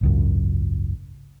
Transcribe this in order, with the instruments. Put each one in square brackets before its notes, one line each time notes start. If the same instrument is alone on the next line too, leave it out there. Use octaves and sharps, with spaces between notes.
[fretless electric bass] G#1 C#2 F#2